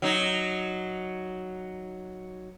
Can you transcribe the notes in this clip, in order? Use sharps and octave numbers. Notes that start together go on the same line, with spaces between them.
F#3 D#4